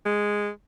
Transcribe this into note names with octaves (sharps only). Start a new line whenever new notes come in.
G#3